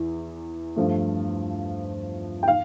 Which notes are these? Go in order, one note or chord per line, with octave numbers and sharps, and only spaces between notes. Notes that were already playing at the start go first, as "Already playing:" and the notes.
Already playing: E2 E3
G2 F3 A3
G5
F5